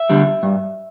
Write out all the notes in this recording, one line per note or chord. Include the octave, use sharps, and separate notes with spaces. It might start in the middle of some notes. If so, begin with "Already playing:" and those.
Already playing: E5
D3 G3
G2